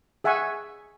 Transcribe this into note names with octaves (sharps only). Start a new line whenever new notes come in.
G#4 E5 F#5 G#5 C#6